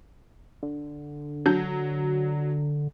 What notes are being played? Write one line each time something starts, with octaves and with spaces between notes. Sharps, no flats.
D3
F#3 D4 G6